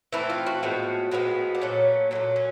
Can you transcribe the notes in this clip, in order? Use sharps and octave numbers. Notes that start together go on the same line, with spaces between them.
E3 A3 C4 E4
F4
F#4
A2 F3 G#3 B3
A2 F3 G#3 B3
D4
A#2 F#3 A3 C#4
A#2 F#3 A3 C#4
C#4